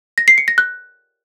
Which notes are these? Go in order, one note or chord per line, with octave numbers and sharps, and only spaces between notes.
A#6
C7
C#7
A#6
F#6